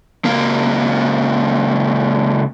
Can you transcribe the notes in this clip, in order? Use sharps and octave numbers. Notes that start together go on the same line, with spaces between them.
C#2 A#3